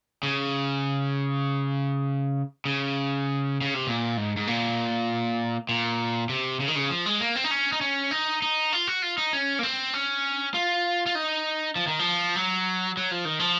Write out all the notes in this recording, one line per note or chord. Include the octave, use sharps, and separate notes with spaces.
C#3
C#3
C#3
C3
A#2
G#2
G#2
A#2
A#2
C3
C#3
D#3
C#3
F3
G#3
A#3
C4
D#4
C#4
D#4
C#4
D#4
D#4
F4
F#4
F4
D#4
C#4
A#3
C4
C#4
F4
F4
D#4
F3
D#3
F3
F#3
F#3
F3
D#3
F3